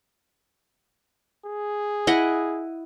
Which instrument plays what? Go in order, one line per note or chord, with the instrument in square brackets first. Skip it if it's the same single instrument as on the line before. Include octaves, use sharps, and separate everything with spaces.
[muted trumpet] G#4
[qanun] E4 D#5 F#5